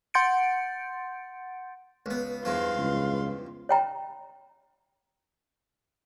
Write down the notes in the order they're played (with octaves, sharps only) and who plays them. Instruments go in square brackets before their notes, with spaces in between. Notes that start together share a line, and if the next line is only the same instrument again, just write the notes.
[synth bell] F#5 C6 G6 A6 C#7 D7
[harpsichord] C#2 B3
[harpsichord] E2 G2 F3 [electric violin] F5 C6
[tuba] C#2
[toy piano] C#5 G5 A#5